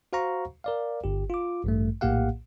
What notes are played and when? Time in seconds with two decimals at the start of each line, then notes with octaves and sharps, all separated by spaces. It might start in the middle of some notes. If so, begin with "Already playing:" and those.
0.13 F#4 C5 F5 F#5 A#5 C#6
0.64 A#4 D5 F5
1.04 G1 G4
1.30 F4 D6
1.64 A1 G2 A3
2.01 A#1 A2 A#3 G4 F5 F#5